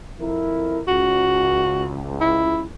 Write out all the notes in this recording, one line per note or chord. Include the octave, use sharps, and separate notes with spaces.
F2 E4 A#4
C#2 F#4
E4